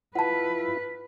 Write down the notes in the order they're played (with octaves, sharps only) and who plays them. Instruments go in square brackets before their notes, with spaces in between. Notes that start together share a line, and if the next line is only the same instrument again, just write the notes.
[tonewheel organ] E4 F4 [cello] B4 [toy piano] F#5 A5